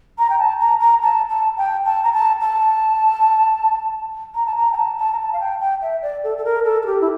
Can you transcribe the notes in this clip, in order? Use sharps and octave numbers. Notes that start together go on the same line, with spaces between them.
A#5
G5
A5
A#5
A#5
A5
A5
G5
A5
A#5
A5
A5
A#5
A5
A#5
G5
A5
A5
A#5
A5
F5
G5
G5
E5
D5
A4
A4
A#4
A4
A4
G4
E4